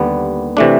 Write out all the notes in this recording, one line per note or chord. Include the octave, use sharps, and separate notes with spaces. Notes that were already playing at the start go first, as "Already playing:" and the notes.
Already playing: D#2 D3 G3 B3
C3 E3 A3 D4